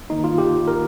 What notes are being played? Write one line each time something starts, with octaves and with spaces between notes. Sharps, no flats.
G2 D#3 A#3 D#4
F4
G4
A#4